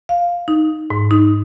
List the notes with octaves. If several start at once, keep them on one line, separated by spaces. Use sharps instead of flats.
F5
D#4
G#2
D#4